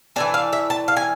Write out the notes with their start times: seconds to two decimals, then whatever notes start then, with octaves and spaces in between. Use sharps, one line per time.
0.16 E3 A3 D4 G#5
0.34 F5
0.53 E5
0.70 A5
0.88 F5
0.97 G#5